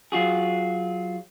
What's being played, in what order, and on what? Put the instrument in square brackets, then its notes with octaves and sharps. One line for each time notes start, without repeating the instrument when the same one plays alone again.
[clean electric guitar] F#3 F4 F#4 G#4